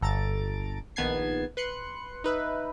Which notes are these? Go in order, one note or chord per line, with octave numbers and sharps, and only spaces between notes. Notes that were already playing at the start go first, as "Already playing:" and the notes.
G1 A4 A#5 A6 D7
A#1 D#3 B3 A5 G#6 C7
B4 C6 F#6 C#7
D#4 B4 E5